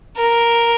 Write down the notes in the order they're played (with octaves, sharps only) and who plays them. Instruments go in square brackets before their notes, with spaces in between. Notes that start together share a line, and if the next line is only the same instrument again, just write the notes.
[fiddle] A#4